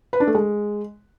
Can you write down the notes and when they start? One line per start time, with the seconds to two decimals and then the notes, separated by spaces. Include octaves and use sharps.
0.13 B4
0.20 D4
0.27 A3
0.35 G#3